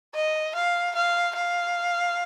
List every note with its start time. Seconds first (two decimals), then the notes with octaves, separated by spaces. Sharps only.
0.15 D#5
0.55 F5
0.95 F5
1.36 F5